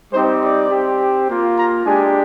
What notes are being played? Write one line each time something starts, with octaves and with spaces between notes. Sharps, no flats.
G3 C4 D#4 G4 C5
D5
C4 G4
A#3 F4
A#5
G#3 D4 G4 G#5